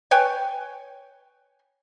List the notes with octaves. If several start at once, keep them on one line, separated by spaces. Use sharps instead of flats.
B4 C#5 G5 G#5